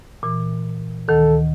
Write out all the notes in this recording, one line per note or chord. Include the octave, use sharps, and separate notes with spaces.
A#2 E3
D2 D#3 A4